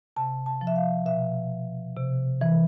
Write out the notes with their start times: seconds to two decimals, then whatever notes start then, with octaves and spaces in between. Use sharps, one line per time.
0.16 C3 A5
0.46 A5
0.61 F3
0.67 E5
0.76 F5
1.06 B2 E5
1.96 C3
2.41 E3